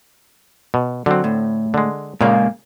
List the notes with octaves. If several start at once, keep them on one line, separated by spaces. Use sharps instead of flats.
B2
D3 F#3 C4
A2
D3 G#3
A#2 C#3 G#3 A#3 F5